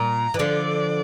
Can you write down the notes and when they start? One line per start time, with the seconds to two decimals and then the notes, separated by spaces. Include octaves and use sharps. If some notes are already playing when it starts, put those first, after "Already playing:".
Already playing: A#2 A#5
0.34 E3
0.39 D3 F3 D5